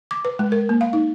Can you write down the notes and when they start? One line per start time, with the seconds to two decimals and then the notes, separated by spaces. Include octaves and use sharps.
0.11 D6
0.25 B4
0.39 G#3
0.52 A#4
0.69 A#3
0.81 F5
0.93 D#4